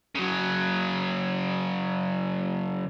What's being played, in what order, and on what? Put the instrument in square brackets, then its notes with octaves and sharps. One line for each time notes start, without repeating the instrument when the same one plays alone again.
[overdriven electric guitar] C#3 F#3